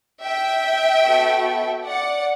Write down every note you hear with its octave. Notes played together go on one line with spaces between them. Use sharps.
E5 G5
B3 F#4 A4
D5 F#5